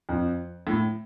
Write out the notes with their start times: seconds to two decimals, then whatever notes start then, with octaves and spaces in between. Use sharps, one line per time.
0.09 F2
0.67 A2